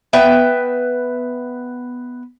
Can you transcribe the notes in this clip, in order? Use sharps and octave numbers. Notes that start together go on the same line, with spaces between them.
B3 B4 E5 G5